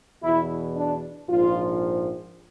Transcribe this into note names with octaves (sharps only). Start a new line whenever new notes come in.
E2 B2 E4
D4
A#1 G#2 F3 F4